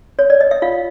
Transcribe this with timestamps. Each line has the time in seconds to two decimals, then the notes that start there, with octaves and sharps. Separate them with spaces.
0.19 C#5
0.30 D5
0.41 D#5
0.51 E5
0.62 F4 F5